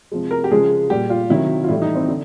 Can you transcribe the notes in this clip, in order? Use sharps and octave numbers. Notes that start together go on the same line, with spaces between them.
C3 F3 G#3
A#4
G4
C#3 F3 G#3 G#4
A#2 G3 G4
F4
C3 D#3 F#3 E4
F4
A2 E3 G3 E4
D#4
C4
D3